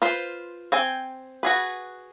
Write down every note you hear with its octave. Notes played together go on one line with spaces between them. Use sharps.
F4 B4 C5
C4 G5 G#5
F#4 G#4 B4